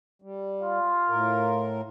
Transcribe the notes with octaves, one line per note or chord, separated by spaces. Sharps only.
G3
F4
A2 A#4